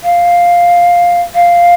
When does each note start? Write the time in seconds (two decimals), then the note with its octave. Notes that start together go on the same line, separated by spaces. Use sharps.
0.03 F5
1.35 F5